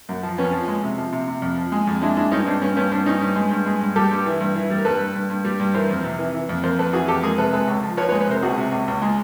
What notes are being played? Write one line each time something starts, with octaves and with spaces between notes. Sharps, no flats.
F#2
F3
F2 B3 C#4
F3
G#3
C3
F3
C3
C3
F2
F3
G#3
F2
G#3 D4 E4
G#3 D4 E4
G2 C#4 D#4
G2 C4 D4
G2 B3 C#4
G2 B3 C#4
G2 C4 D4
G2 C#4 D#4
G2
G#3
G2
G#3
G2
G3 G4 A4
G2
E3
G2
E3
G3
A#4
G2 A4 B4
G2
G2
G2
G3
G2
E3 A#4 C5
F2
C3
E3
E3
F2
F2 A#4 C5
F2 A4 B4
E3 F#4 G#4
F2 G4 A4
G#3 G#4 A#4
C3 A4 B4
G#3 A4 B4
C#2
F3
F3 B4 C#5
B4 C#5
G#3
B4 C#5
C3 A#4 C5
C#2 F#4 G#4
C3
C#2
C#2
G#3